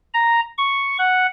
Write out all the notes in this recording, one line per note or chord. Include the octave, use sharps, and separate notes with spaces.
A#5
C#6
F#5